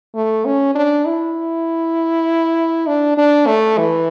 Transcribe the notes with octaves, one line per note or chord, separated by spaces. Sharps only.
A3
C#4
D4
E4
D4
D4
A3
E3